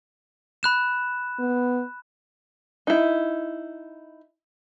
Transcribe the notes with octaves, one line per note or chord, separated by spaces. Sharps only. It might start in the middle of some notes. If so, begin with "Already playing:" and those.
B5 F#6 E7
B3
D#4 E4